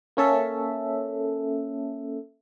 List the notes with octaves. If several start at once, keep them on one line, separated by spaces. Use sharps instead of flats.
A#3 C#4 A4 E5